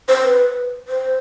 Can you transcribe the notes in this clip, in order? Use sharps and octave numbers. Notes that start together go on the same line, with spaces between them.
C5
B4
C5